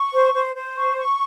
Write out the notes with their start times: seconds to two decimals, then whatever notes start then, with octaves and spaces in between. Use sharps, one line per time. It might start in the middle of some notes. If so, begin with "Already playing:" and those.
Already playing: C#6
0.13 C5
0.34 C5
0.55 C5
0.75 C#6
0.96 C#6